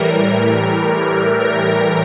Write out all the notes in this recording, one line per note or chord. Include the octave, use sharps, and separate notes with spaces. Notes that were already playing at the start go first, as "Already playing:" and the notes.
Already playing: A2 E3 G3 A#4
A#4